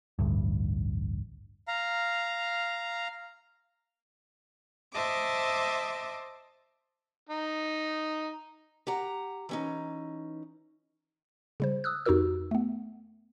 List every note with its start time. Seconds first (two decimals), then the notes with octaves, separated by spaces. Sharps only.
0.19 A1 D2 G2
1.68 F5 A#5
4.93 C5 D#5 E5 A5 D6
7.29 D#4
8.87 G4 F#5 A#5
9.49 E3 C#4 D#4
11.60 C#3 G3 C5
11.84 D#6 E6 F#6
12.05 F2 D#4 F#4 G4 A#4 E6
12.51 A3 B3